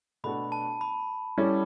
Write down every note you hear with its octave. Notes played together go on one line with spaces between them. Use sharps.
B2 A3 D4 F#4 A4 B5
A5
B5
G3 C#4 E4 A4